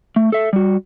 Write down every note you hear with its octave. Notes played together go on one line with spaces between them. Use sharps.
A3
A4 E5
G3 F#4